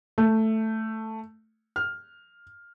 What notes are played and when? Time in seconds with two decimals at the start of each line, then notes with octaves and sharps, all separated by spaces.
0.18 A3
1.76 F6